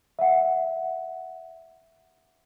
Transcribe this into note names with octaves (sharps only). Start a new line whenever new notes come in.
E5 F#5